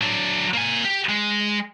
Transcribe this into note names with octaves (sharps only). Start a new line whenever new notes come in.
F#3 D4
A#3 G#5
G4
G#3